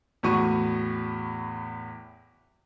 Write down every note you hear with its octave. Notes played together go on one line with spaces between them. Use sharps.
E2 A2 F#4 C#6 D#7